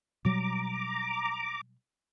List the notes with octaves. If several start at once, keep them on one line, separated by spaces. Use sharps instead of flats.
B2 F#3 G3 A#5 D6